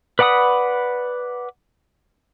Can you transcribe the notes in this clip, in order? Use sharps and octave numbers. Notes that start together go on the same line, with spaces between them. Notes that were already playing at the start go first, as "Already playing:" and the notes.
B4 D5 F#5 B5 D#6